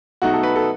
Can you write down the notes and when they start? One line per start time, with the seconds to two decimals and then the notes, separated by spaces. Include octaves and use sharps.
0.22 B2 F#3 A3 D#4 F#4
0.33 A4
0.43 B4
0.56 A4